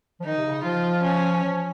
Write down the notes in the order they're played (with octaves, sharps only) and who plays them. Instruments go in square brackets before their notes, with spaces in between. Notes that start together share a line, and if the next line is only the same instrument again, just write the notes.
[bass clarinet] F3
[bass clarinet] D#3 [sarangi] D#4
[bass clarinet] C3
C#3
[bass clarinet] F3 [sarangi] F4
[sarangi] C#4
[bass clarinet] F3